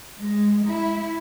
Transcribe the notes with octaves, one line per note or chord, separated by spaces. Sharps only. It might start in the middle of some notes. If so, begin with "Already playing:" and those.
G#3
E4